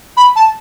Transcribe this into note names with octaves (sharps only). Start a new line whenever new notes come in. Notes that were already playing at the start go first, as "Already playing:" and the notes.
B5
A5